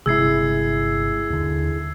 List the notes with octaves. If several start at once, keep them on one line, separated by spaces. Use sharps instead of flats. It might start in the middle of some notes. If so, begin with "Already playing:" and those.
G1 C3 G#3 E4 G#4 E6 G#6 C7
D#2 D3